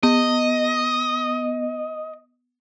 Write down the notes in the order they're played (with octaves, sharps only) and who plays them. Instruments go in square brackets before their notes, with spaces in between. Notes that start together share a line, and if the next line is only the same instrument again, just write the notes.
[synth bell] B3 [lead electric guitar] D#5